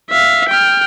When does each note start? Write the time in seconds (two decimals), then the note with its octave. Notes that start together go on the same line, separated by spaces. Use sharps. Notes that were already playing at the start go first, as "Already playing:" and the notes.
0.10 E5 F5
0.49 G5 F6